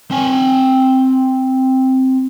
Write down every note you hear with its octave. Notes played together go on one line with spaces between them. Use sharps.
C4 G#5